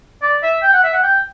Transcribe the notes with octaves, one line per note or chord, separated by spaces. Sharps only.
D5
E5
G5
F#5
E5
F#5
G5